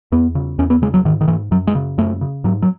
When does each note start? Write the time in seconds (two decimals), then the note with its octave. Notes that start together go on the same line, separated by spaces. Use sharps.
0.12 E2 B3
0.35 C#3
0.58 E2 C#4
0.70 B3
0.82 C#3 G#3
0.94 F#3
1.05 G#2 D#3
1.21 D#3
1.28 G#2 E3
1.51 F#2 F#3
1.67 G#3
1.75 C#3
1.98 F#2 A3
2.21 C#3
2.44 G#2 F#3
2.62 F#3